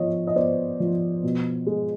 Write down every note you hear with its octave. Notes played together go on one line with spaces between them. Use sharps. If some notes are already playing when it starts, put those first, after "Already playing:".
Already playing: F3 B3 C#5 D#5
D#5
B3 C5 D5
F3
B2
G#3